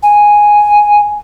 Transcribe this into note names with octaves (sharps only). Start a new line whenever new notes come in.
G#5